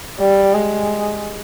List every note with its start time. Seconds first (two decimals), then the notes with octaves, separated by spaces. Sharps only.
0.20 G3
0.55 G#3